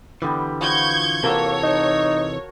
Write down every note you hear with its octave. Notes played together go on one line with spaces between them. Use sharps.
D3 E3 G3 B3 G4
F3 B3 F#4 C#6 G6 G#6
C3 E3 A#3 F#4 A4 A#4 C#5 A5
D#4